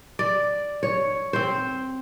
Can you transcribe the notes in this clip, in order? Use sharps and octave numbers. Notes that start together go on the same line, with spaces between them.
D5
C#5
C4 C5